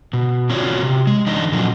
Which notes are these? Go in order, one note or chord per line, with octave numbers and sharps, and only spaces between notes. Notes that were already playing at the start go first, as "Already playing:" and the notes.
B2
C4 F4 F#4 C#5 D5
C3
G#3
E3 G#3 D4 D#4 D5 D#5
A#2 C#3 F3 F#3